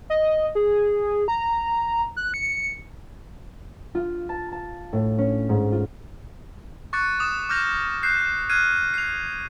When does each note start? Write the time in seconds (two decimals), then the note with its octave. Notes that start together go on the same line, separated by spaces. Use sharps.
0.10 D#5
0.55 G#4
1.28 A#5
2.17 F#6
2.34 C#7
3.95 F4
4.29 A5
4.52 A5
4.93 A2
5.18 C#4
5.49 G#2
5.72 F4
6.93 C#6 D6 F#6 A6 C#7
7.20 D6 D#6 E7
7.49 D6 F6 G6 A#6 E7 F7
8.03 F#6 G6 C7
8.49 F6 F#6 G#6 C7 D#7
8.94 C7 F7